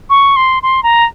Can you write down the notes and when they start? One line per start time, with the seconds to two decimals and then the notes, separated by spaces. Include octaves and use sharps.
0.10 C#6
0.36 C6
0.63 C6
0.83 A#5